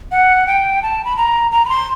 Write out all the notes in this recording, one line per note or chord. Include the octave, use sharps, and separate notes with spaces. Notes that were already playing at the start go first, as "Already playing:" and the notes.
F#5
G5
A5
B5
A#5
A#5
B5
C6